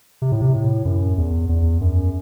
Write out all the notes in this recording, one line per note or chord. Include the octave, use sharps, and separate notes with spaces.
C3
A2
C3
A2
F#2
E2
E2
F#2